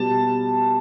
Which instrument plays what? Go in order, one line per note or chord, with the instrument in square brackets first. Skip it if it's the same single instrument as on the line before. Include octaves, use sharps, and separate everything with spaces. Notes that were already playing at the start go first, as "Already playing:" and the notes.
Already playing: [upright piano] B2 G3 A5